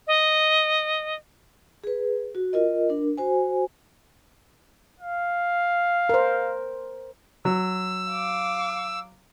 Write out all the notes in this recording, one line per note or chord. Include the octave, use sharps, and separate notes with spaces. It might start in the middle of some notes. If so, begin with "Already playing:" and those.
D#5
G#4 B4
F#4
F4 A#4 D#5
D4 A#4
F#4 C5 G#5
F5
A#4 C5
F#3 E6
F5 D6